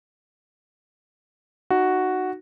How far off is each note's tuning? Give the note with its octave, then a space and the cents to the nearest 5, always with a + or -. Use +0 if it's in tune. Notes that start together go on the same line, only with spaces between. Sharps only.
D#4 -20 F#4 +0